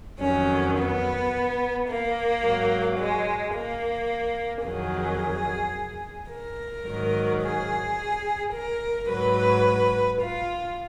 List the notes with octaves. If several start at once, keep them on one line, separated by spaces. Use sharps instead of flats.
F2 D#3 F#3 C#4
B3
A#3
G#2 F#3
G#3
A#3
F2 D#3 F#3 G#4
A#4
G#2 D#3 F#3
G#4
A#4
G#2 F#3 B4
F4